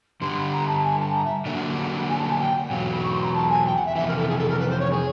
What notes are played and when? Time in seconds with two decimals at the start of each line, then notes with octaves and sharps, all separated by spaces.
0.21 G2 D3 G3 C6
0.37 B5
0.52 A#5
0.67 A5
0.83 G#5
0.99 A5
1.15 A#5
1.25 E5
1.46 D3 F#3 A#3 D4 F#5
2.08 G#5
2.18 A5
2.29 G#5
2.39 G5
2.55 F#5
2.71 E2 B2 F#3 F5
2.92 B5
3.03 C#6
3.12 C6
3.23 A#5
3.34 A5
3.49 G#5
3.65 G5
3.75 F#5
3.85 E5
3.96 F2 C3 E3 E5
4.07 A#4
4.16 A4
4.27 G#4
4.38 A4
4.49 A#4
4.59 B4
4.69 C5
4.79 C#5
4.90 G#4